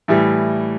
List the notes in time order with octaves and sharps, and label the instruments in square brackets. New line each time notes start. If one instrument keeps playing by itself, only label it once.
[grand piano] A2 E3 G3